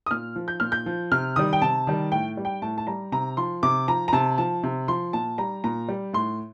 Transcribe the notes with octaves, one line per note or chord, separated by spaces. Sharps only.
D#6
A#2 F6
F3
G6
A#2 F6
G6
F3
C3 F6
D#3 G3 D#6
G5
C3 A5
D#3 G3
A2 G5
G3
G5
A2 A5
A5
G3 A#5
C3 A#5
F3 C6
C3 D6
F3 A#5
A#5
C3 A5
F3 A5
C3
F3 C6
A#2 A5
G3 A#5
A#2 A#5
G3
A2 C6